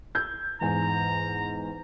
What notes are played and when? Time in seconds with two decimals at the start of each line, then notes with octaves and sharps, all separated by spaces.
0.15 E6 G6 G#6
0.61 E2 G#2 G#5 A#5